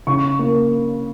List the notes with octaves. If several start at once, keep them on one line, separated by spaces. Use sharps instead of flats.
C#3 C#6
A#3